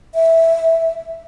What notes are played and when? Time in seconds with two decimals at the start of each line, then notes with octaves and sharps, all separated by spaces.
0.15 E5